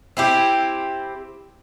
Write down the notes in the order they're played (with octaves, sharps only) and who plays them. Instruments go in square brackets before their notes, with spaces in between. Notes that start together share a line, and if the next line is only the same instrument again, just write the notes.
[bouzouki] C4 E4 G4